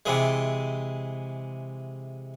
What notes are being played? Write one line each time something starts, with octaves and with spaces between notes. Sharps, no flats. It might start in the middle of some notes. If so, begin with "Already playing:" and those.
C3 E3 G#3